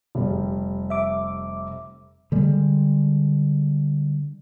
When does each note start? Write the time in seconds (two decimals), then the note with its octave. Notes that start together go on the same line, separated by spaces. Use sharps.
0.15 F1 G3
0.90 E5 D6
2.32 D3 G3 G#3